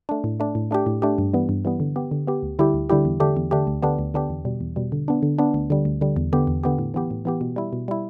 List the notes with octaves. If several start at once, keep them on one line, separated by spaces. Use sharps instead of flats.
A3 D4
A2
A3 D4
A2
A3 D4 G4
A2
A3 D4 G4
G2
E3 G3 B3
G2
E3 G3 B3
D3
B3 G4
D3
B3 G4
D2
D3 G3 E4 G4
D2
D3 G3 E4 G4
E2
D3 A3 D4 G4
E2
D3 A3 D4 G4
D2
D3 B3 D4 G4
D2
D3 B3 D4 G4
E2
B2 G3
E2
B2 G3
D3
B3 D4
D3
B3 D4
D2
D3 G3
D2
D3 G3
E2
D3 B3 G4
E2
D3 B3 G4
A2
E3 B3 G4
A2
E3 B3 G4
B2
G3 E4
B2
G3 E4